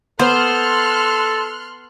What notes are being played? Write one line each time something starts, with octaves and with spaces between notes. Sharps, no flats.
B3 A4 C5 C6 F6 F#6